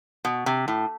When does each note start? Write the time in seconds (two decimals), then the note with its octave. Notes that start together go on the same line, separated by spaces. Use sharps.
0.25 B2
0.46 C3
0.68 A2